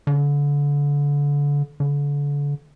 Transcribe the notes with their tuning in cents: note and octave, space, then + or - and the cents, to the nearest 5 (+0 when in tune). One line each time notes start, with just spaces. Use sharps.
D3 -30
D3 -35